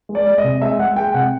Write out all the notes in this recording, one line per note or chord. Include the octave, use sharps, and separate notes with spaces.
G#3
D5
G#3
D#5
C3
G#3 E5
G#3 F#5
G#3 G5
C3 F#5